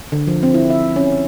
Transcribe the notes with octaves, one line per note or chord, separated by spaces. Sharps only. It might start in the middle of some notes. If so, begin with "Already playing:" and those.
D3
F3
C4
E4
E5
C#4